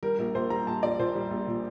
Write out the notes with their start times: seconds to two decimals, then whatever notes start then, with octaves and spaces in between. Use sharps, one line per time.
0.03 G3 A#4
0.19 A#1 A#4
0.35 A#1 C5
0.50 G3 A#5
0.67 A#1 A5
0.83 A#1 D5
0.99 A#2 C5
1.15 G3
1.31 A#1
1.47 A#2